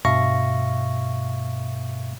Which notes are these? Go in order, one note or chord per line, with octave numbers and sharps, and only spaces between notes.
G2 B2 E5 F5 C#6 A#6